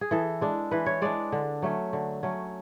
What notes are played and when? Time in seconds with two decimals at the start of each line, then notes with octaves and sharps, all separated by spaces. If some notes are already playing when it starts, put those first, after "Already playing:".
0.01 G#4
0.11 E3 A4
0.41 G#3 D4
0.71 E3 B4
0.86 C#5
1.02 G#3 D4 D5
1.32 D3
1.62 F#3 A3 C#4
1.93 D3
2.23 F#3 A3 C#4